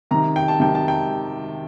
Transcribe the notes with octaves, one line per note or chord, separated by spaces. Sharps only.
C3 D#3 A#5
G5
A5
C3 D#3 G5
A5
G5